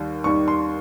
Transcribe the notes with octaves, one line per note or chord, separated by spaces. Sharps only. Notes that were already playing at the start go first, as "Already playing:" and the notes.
Already playing: D#2 D#3 G3
D#2 D#3 G3 C#6
C6